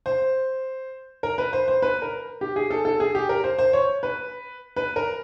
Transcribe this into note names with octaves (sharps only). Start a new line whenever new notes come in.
C5
A#4
B4
C5
C5
B4
A#4
G4
G#4
A4
A4
G#4
G4
A#4
C5
C5
C#5
B4
B4
A#4